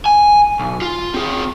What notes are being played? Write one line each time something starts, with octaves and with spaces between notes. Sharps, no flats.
G#5
B1
F4
C4 G#4